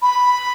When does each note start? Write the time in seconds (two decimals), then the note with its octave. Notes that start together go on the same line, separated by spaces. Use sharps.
0.02 B5